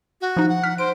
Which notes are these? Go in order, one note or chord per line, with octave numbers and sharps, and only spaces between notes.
F#4
F3 D#4
F#5
F6 B6
C5 D7